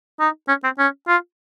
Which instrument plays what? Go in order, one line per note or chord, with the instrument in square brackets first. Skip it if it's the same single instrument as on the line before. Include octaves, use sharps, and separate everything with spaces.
[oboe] D#4
C#4
C4
C#4
F4